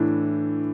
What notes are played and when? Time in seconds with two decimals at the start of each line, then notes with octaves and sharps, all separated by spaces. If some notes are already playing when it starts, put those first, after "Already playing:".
Already playing: A2 E3 D4